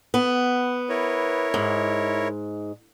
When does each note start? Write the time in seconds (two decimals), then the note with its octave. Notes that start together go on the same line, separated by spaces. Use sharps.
0.14 B3
0.89 E4 A#4 C#5
1.54 G#2